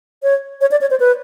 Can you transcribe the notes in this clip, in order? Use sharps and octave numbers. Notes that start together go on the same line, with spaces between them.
C#5
C#5
D5
C#5
C5
B4